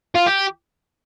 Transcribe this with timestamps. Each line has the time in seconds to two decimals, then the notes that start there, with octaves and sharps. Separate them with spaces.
0.15 F4
0.26 G4